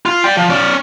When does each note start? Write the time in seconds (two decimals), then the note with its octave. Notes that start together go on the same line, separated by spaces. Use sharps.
0.06 F4
0.24 D5 G5
0.37 F3
0.50 C#4 D5